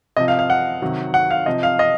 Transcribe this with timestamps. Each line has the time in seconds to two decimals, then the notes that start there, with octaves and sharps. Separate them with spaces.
0.17 C3 F3 D#5
0.28 F5
0.39 F5
0.50 F#5
0.82 C3 D#3 F#3
1.14 F#5
1.31 F5
1.46 C3 F3 D#5
1.63 F5
1.79 D#5